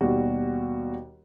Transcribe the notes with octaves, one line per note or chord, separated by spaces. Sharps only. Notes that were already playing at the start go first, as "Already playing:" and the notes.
D#2 B2 G3 F#4